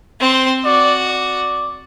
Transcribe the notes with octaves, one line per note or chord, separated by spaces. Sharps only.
C4 C6
F#4 D5
D5